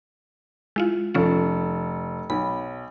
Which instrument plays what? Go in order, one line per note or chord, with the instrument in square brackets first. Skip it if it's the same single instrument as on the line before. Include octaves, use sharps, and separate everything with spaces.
[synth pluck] G#3 E4 F4
[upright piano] F1 A4 [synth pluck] F3 C#4 F4
[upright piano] B1 [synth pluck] B5